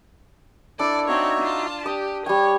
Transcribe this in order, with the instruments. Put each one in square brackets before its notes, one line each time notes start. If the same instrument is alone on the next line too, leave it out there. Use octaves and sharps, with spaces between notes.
[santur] D4 [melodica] E4 A4 [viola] D5
[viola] C4 C#5 [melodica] D#4 F#4 E5
[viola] F4 A5
[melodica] D4 [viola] G4 [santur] D#6
[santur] G3 G5 [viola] C#5